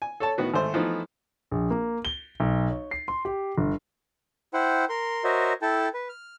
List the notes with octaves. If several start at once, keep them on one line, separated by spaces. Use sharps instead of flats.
G#5
A4 C#5 A5
A2 D#3 B3 F#4
G#1 A3 C5 C6
E3 F3 A3 B3 D#4
A#1
A#3
G7
B1
C#5
C7
C6
G4
G1
E4 C5 F#5 G5
A#4 C6
F#4 A#4 C5 C#5 D#5 E5
E4 A4 G5 A5
B4
F6